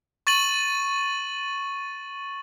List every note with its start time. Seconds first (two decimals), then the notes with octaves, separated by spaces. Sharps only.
0.27 C#6 A6 D#7 F#7